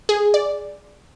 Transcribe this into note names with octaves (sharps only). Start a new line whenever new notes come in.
G#4
D5